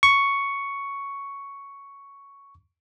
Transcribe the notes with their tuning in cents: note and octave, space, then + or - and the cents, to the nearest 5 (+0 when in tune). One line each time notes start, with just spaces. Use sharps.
C#6 +5